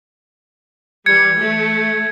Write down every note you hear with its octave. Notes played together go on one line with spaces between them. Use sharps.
E3 G3 G#6 C#7
A3